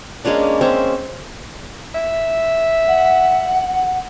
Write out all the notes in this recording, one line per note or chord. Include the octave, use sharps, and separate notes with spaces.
G#3 A#3 C#4 D4
C4 C#4 E5
E5
F#5